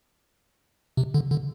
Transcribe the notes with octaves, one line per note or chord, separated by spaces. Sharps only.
C3
D3
D3